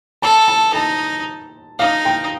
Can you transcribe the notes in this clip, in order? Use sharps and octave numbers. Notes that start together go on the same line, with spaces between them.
A4 A5
A5
D#4 A5
D#4 F5
G5